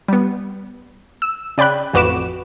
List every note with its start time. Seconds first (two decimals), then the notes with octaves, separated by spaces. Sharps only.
0.08 G3 B3
1.22 E6
1.58 C#3 D5 G5 B5 F#6
1.93 A1 F2 F#4 B4 D6 E7